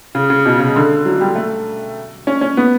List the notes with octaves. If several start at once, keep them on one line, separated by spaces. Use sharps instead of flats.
C#3
C#3
B2
C#3
D3
F#3
G3
A3
C#4
C#4
B3